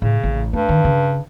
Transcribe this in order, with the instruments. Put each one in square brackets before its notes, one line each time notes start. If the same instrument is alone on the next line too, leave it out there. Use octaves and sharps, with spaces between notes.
[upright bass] A2 [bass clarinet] C#3
[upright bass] A1
[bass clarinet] G2 [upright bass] A3
[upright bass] D#3
C#3